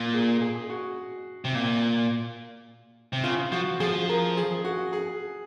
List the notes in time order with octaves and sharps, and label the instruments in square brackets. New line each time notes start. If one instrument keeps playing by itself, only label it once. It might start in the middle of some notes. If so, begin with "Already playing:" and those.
Already playing: [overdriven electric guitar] A#2
[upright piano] G#4
G#4
F#4
[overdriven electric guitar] C3
A#2
C3
[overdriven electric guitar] C#3 [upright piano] F4
[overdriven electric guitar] F3 [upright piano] F#4
[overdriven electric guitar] F3 [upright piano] G#4
[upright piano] A#4
G#4
F#4
G#4